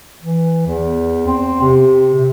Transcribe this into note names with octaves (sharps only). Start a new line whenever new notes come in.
E3
E2
C4
C3
C3